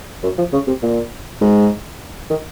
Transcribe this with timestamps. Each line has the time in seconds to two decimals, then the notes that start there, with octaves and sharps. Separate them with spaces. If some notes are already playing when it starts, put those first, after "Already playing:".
0.23 F#2
0.38 F3
0.53 C#3
0.67 C3
0.82 A#2
1.41 G#2
2.30 D#3